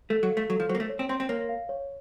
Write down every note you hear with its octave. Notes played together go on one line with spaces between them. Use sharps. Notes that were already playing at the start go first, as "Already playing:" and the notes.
A3 A4
F#3
F5
A3
F#3 A4
F3
F#3 C5
A#3
A3
C#5
C4
C4 C6
C4
A#3 C#5
F5
C#5